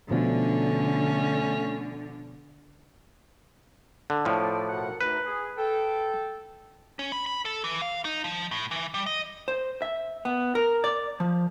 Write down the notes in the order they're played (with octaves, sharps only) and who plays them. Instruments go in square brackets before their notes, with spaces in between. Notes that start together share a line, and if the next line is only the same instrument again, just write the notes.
[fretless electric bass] B2 F3 [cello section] D3 [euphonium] A3 [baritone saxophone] C#4
[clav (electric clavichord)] D3
[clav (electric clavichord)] A2 F3 [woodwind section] D5
[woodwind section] B2 A#4 F#5
[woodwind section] D2 D#4 [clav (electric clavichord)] B4
[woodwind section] G#4
A4 G5
[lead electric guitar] C#4
B5
B5
A4
E3
F5
D#4
F3
A2
E3
G3
D#5
[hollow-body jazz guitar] C5
E5
B3
A#4
D5
F3